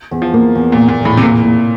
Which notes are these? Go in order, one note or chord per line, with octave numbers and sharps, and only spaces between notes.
E2
F3
A#3
E2
A#2
A#3
A#2
E2 A2
C3
A#2 A#3
A#3